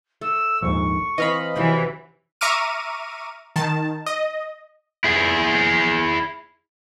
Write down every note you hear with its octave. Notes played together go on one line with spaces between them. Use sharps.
A3 E6
A#1 D#2 G#2 C#6
E3 C4 D#5 F5 B5
C3 E3 F#3 G5
E5 A#5 C#6 D6 F6 D#7
D#3 A5
D#5
E4 G#4